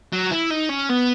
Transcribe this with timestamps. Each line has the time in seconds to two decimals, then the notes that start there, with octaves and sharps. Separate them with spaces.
0.13 F#3
0.31 E4
0.51 D#4
0.70 C#4
0.90 B3